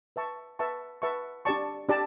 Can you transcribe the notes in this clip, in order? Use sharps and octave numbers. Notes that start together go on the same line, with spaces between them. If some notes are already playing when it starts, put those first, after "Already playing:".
B4 E5 A5 C#6
B4 E5 A5 C#6
B4 E5 A5 C#6
D4 G4 D5 A5 C#6
D4 G4 D5 A5